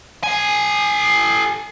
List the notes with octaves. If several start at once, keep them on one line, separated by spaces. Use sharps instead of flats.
A4 G#5